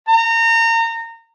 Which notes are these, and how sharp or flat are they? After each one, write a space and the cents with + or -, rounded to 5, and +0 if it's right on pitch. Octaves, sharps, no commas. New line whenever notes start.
A#5 -30